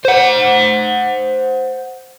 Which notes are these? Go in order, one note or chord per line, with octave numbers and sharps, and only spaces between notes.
C5 F#5